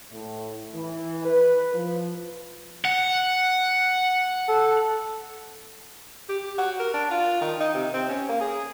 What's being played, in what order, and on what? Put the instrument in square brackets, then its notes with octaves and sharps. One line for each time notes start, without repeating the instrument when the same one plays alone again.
[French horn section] A2
E3
B4
F3
[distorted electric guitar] F#5
[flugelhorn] A4
[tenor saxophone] G4
F#4
A#4
D4
F4
D#3
D#4
C3
C4
C#4
A#3
G#4